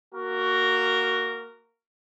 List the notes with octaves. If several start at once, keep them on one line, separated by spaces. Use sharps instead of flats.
A#3 F#4 A#4